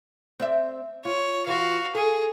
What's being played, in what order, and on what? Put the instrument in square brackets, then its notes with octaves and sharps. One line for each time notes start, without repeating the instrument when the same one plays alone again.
[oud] C4 D5 E5
[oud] F4 [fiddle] C#5
[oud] E3 F4 [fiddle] F#4 F5
[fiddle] G#4 [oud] A4